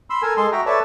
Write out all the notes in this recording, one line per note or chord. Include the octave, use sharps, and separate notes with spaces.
B5 C6 E6
A4 A#4 G#5
G#3 G#4 A4 C6
F#4 E5 G5 A#5
A4 B4 C#5 D5 E5 A5